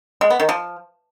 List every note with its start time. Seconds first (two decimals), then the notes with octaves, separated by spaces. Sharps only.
0.21 G#3
0.30 B3
0.40 D#3
0.49 F3